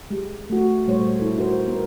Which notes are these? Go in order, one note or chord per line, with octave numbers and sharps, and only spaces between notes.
G#3 G4
A3 F#4
A#2 G3 A3 C5 C#5
E4 A4
D#4 F#4 A#4 C5
B3 A#4